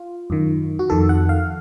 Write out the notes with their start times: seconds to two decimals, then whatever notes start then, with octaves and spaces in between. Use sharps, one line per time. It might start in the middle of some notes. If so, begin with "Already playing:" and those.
Already playing: F4
0.30 F#2 D#3
0.79 F#4
0.90 F2 D#3 A4
1.09 F#5
1.29 F5